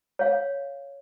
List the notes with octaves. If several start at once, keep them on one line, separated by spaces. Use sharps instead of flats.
C#5 F5